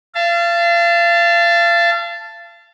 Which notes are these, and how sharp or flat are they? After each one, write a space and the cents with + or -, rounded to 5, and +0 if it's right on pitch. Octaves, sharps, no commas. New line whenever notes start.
F5 -35 A5 +0